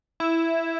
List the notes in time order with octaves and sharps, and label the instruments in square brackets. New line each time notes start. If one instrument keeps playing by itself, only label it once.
[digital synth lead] E4